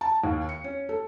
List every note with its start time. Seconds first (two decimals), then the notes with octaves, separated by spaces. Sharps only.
0.01 A5
0.24 D#2
0.49 C#7
0.64 C#4
0.89 A4